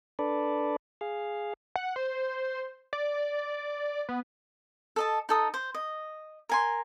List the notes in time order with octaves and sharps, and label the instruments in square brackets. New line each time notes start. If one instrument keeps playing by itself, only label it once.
[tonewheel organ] D4 A4 B4 D5
G#4 F5
[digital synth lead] F#5
C5
D5
B3
[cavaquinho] A4 D#5 A5
D#4 A4 D#6
C5
D#5
A#4 G#5 C6